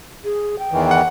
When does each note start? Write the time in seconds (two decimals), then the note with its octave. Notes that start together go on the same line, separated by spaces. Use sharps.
0.25 G#4
0.59 G5
0.72 E2 D#3 E3
0.91 F#5